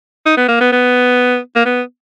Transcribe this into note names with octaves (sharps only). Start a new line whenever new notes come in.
D#4
B3
A#3
B3
B3
A#3
B3